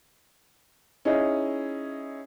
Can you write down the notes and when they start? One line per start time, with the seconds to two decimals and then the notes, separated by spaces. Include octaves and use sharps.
1.05 C#4 D#4 E4 G#4 D#5